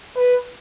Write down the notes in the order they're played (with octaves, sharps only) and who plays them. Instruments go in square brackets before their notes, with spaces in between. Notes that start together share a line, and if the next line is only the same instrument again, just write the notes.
[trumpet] B4